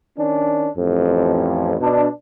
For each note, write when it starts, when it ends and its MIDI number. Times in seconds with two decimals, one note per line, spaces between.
0.18 0.68 51
0.18 0.68 61
0.18 0.68 62
0.77 1.75 33
0.77 1.75 41
1.81 2.07 47
1.81 2.07 62